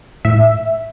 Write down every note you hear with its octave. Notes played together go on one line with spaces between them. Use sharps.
A2 E5